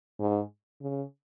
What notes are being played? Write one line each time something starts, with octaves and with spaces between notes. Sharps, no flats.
G#2
C#3